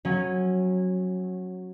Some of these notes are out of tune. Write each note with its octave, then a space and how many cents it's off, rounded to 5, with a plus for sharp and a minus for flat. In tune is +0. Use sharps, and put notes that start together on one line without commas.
F#3 -5 C#4 -20